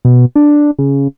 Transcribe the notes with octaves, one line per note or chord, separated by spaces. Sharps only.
B2
D4
C#3